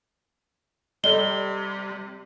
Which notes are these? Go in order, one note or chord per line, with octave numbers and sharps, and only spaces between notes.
C3 G3 A4 D5 D#5 G7